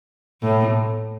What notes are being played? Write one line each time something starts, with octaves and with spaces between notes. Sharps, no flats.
A2